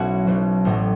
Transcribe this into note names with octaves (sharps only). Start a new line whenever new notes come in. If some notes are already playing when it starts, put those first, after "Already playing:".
Already playing: B1 B2 F#3 B3 C#4 E4 F#4
B1 B2 F#3
A1 A2 F#3